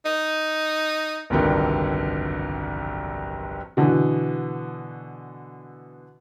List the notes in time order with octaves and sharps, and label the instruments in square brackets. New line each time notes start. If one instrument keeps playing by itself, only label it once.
[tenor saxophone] D#4
[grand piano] G1 C2 F2 D3 D#3 F#3
[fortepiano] B2 D3 E3 B3